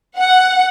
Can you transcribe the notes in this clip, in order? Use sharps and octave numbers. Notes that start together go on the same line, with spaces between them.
F#5